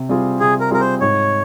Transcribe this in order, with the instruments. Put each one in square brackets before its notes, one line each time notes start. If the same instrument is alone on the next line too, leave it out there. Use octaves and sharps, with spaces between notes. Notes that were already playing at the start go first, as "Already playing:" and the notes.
Already playing: [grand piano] C3
G3 C4 F4 G#4
[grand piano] C3 [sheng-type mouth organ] G#4
[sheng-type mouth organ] A#4
[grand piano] G3 C4 F4 G#4 [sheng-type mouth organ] A#4
[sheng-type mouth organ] C5
[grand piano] G#2 [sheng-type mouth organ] C#5